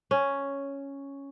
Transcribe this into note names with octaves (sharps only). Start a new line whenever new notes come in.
C#4